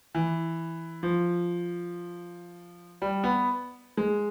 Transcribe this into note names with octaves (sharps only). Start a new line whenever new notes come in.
E3
F3
G3
B3
G#3